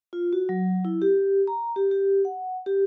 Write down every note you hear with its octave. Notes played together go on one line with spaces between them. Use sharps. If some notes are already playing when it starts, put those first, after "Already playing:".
F4
F#4
F#3
E4
G4
A#5
G4
G4
F#5
G4